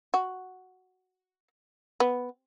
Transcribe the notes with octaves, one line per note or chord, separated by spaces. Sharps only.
F#4
B3